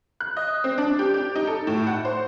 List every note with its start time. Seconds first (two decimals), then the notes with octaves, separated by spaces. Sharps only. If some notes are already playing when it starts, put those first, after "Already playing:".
0.20 F#6
0.37 D#5
0.64 C4
0.78 D4
0.99 G4
1.14 G4
1.35 D#4
1.47 A4
1.67 A2
1.87 F#5
2.05 C5